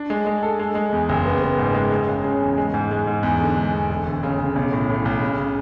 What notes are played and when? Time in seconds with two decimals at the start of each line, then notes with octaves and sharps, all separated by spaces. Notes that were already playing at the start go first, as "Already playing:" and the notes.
Already playing: D4
0.10 G#3
0.27 G#3
0.43 A4
0.59 G#3
0.75 G#3
0.93 E2
1.09 F#1
1.26 B3
1.42 B3
1.58 G#2
1.74 G#3
1.92 G#3
2.07 C#3
2.24 C#3
2.41 E2
2.58 G#3
2.74 G#2
2.91 G#3
3.07 G#2
3.23 E2
3.41 D3
3.56 G#3
3.73 E2
3.89 E1
4.05 D2
4.23 C#3
4.40 C#3
4.56 B1
4.72 A2
4.89 A2
5.05 B1
5.21 C#3
5.38 C#3